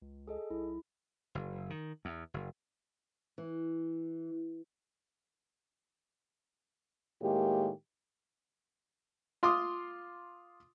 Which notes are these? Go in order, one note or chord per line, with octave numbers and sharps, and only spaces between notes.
C#2
G#4 A4 D#5
B1 E4
F#1
D#3
E2
F#1
E3
A2 D#3 G#3 A#3 G4
F4 C6 D6 D#6